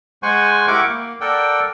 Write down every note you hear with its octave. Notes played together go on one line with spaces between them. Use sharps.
G#3 C5 F#5 G#5 C#6
E4 G4 A#4 F#5 C#6 D6
A#3
A4 A#4 D5 F#5 G5